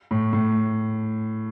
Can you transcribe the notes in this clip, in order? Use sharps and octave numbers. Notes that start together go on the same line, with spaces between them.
A2
A2